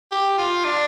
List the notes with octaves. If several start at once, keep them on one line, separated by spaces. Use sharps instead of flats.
G4
F4
D4